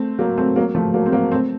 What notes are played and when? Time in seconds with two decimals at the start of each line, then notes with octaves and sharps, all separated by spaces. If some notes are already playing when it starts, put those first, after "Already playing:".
Already playing: A3 C4
0.19 F#3 A#3
0.38 A3 C4
0.56 F#3 A#3
0.75 F3 A3
0.94 F#3 A#3
1.06 C4
1.12 F#3 A#3
1.32 A3 C4